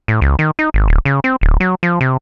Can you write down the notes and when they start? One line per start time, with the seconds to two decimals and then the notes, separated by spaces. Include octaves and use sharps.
0.08 A2
0.21 C#2
0.39 D#3
0.59 D#4
0.74 G#1
0.88 D1
1.05 C#3
1.24 C4
1.41 D1
1.60 F#3
1.83 F3
2.01 C3